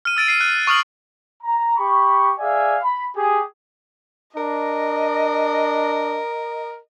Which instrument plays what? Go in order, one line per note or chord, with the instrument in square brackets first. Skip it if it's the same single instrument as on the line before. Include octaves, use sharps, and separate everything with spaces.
[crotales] F6 D#7
E6 A6 D7 D#7
C7 D#7
F#6
C#6 D#6 F6 F#7
[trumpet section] A#5
G4 B5 C#6
G#4 D5 E5 F5 G#5
B5
G4 G#4
[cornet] D4 [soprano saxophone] A#4 [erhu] D#5